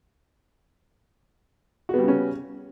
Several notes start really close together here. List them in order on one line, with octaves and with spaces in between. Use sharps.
F#4 B3 G3 C#3 C#4